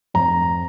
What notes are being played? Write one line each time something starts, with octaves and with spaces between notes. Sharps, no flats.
F2 A#5